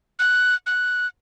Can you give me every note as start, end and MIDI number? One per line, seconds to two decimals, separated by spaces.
0.19 0.55 90
0.66 1.07 90